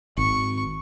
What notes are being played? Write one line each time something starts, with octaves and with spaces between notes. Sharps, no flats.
G#1 C#6